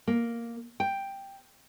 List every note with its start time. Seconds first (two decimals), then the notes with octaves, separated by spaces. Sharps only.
0.08 A#3
0.80 G5